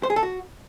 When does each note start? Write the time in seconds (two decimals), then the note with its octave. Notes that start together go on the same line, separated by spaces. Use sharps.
0.03 C5
0.10 G#4
0.16 A4
0.23 F#4